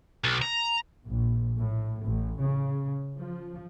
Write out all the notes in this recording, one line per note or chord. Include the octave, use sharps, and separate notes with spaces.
B1
A#5
A#1
A2
A1
C#3
F3